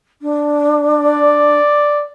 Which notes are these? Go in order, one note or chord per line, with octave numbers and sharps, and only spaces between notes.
D4
D5